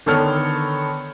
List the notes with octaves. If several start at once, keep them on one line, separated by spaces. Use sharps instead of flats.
D3 D#3 B3 A4 C#5 F6